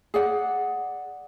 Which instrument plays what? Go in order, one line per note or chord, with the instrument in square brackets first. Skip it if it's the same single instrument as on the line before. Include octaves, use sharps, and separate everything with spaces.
[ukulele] G#4 D5 F#5